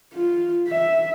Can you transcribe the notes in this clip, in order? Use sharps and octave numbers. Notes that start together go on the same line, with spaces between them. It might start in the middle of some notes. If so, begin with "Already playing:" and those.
F4
E5